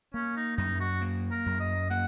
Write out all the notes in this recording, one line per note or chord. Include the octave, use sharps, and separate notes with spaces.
A#3 C#4
D#4
F#2 D#4
F#4
A#3
A#4
F#2
D#5
A#3 F#5